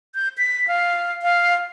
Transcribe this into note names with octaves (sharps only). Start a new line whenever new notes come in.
G6
B6
F5
F5